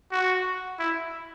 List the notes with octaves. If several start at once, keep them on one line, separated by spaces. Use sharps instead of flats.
F#4
E4